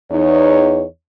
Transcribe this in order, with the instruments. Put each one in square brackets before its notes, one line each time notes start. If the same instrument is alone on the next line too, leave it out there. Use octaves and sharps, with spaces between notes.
[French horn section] E2 D#4 C#5